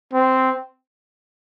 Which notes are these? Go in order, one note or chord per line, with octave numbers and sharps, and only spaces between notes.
C4